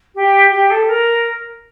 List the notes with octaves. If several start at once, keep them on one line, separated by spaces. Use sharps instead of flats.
G4
G4
A4
A#4